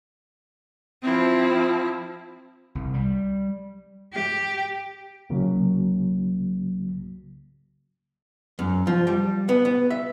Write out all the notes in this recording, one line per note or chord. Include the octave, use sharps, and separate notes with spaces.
F3 C4 E4
C2
G3
G4
C2 C#3 F#3 A#3
F#2
F3
G3
B3
B3
E5